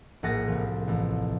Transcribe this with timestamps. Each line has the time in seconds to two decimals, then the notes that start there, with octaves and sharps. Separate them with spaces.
0.23 A#1 A2 G#4 F#5 A6 A#6
0.48 C2 F3
0.88 A1